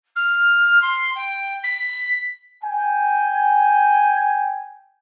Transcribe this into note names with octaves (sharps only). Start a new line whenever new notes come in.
F6
C6
G5
B6
G5 G#5